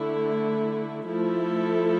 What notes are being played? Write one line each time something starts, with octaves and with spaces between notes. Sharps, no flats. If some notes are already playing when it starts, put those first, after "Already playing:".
Already playing: D3 A3 E4
F3 A3 E4 A4